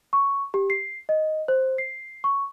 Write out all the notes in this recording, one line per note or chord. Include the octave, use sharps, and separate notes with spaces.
C#6
G4
C7
D#5
C5
C7
C#6